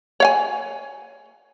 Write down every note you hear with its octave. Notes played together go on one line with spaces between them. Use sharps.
C#5 F5 G#5